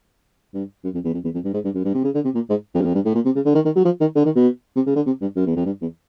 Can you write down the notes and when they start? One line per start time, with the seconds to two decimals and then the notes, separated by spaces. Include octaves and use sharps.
0.54 G2
0.84 F#2
0.94 F2
1.04 E2
1.14 F2
1.24 E2
1.34 F2
1.44 G2
1.54 G#2
1.64 G2
1.75 F#2
1.84 G2
1.94 C3
2.04 C#3
2.14 D3
2.24 C3
2.35 A#2
2.50 G#2
2.75 F2
2.81 F#2
2.85 F2
2.95 G2
3.05 A2
3.15 A#2
3.25 C3
3.35 C#3
3.45 D3
3.55 D#3
3.65 D#3
3.75 F#3
3.85 F3
4.01 D#3
4.16 D3
4.25 D#3
4.36 B2
4.76 C3
4.86 C#3
4.96 D3
5.06 C3
5.21 G2
5.36 F#2
5.46 E2
5.56 F2
5.66 G2
5.81 E2